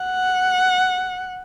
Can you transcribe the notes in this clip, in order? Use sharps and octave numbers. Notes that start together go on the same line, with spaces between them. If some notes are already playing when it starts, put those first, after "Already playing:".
Already playing: F#5